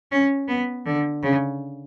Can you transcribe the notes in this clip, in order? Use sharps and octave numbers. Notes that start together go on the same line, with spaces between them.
C#4
B3
D3
C#3